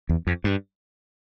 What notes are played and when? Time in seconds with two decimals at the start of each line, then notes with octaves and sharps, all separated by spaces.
0.09 E2
0.27 F2
0.44 G2